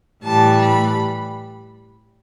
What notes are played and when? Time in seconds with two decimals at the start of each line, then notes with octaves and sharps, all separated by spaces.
0.23 A2 E3 G3 A5
0.61 B5